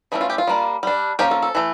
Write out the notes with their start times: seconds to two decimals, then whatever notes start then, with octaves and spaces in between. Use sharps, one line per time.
0.12 E3 A3 C#4 E4
0.21 F4
0.30 G4
0.38 F4
0.47 G3 A#3 D4
0.83 G3 D4
1.19 F3 A#3 C#4 G4
1.31 A4
1.42 A4
1.55 E3 A3